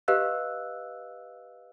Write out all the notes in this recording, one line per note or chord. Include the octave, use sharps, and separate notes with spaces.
G4 B4 D#5 F5 E6 F#6